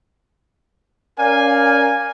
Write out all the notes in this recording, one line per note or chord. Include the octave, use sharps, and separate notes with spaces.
C#4 A#4 D5 F5 G#5